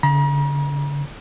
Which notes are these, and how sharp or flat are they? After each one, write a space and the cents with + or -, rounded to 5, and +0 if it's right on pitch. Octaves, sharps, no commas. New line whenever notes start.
D3 -40 A#5 +40